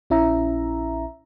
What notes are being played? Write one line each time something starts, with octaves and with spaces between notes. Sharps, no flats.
A#1 C#4 E4 E5 A#5